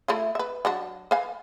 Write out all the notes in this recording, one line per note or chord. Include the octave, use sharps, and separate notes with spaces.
A3 E4 F4
B4 E5
F#3 D4 F#4
B4 F5 G#5